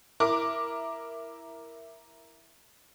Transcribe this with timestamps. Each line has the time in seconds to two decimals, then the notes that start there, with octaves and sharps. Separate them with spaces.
0.20 E4 A#4 D6